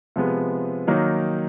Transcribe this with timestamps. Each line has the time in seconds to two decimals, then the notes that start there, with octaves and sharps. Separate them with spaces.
0.16 C3 F3 G#3 B3
0.87 D#3 F#3 A#3 D#4